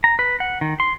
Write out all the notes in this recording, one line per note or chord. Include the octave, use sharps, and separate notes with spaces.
A#5
B4
F#5
D#3
C6